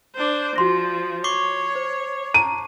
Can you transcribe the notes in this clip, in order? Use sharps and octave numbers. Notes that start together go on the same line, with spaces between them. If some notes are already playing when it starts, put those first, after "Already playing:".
D4 C5
F3 F#4 C6 A#6
C#5 C#6 D6 C7
C5
A5 A#5 D#7